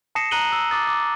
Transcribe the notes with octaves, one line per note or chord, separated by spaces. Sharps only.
A5 D#6 A#6 C7 C#7 E7
A#5 D#6 F#6 D#7 F#7 G7
E6
D6 D#6 A6
D6